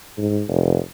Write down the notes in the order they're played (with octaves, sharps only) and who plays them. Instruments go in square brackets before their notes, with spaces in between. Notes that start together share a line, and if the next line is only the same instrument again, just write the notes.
[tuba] G#2
F1